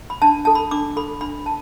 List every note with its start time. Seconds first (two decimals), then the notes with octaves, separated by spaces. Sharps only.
0.10 B5
0.22 D4 A5
0.45 A4 A5
0.55 B5
0.71 D4 D6
0.96 A4 B5
1.21 D4 B5
1.46 A5